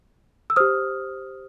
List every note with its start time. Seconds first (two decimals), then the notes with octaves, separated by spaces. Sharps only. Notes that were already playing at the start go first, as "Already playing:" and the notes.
0.50 E6
0.56 G4 C5 D#6 F6